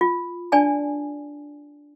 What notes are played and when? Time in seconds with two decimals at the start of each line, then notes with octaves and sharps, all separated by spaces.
0.01 F4
0.52 D4 D5 G#5 A5